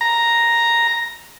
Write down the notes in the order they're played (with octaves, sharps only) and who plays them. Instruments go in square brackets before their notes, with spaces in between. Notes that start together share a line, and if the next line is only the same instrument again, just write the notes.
[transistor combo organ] A#5